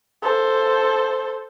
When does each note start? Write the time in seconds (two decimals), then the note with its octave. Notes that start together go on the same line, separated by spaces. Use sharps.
0.22 A4 C5